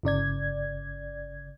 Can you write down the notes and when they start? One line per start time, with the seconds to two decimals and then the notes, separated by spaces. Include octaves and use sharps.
0.03 G1 C#3 D5 G#6